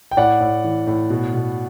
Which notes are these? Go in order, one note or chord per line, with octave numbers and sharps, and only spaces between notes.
G5
A2 D5 F#5
A2
E3
A2
B2
B2